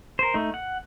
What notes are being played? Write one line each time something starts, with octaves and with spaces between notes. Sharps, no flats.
A#4 C5
A3 D#4
F#5